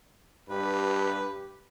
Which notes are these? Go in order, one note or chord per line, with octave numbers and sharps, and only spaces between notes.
G2 G4 B4